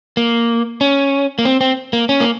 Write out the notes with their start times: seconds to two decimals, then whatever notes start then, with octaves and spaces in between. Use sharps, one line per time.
0.17 A#3
0.81 C#4
1.39 A#3
1.45 C4
1.61 C4
1.93 A#3
2.09 C#4
2.20 A#3